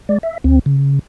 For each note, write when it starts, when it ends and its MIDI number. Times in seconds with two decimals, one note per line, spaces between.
0.09 0.18 56
0.09 0.18 74
0.23 0.38 76
0.44 0.59 38
0.44 0.59 60
0.66 0.99 49